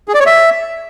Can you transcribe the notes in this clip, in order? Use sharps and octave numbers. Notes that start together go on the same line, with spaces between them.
G#4
D5
C#5
E5